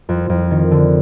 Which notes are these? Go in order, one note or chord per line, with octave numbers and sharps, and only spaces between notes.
F2
F2
D#3
D3